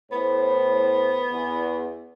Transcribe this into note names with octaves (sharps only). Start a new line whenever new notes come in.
A2 B3 C5
E2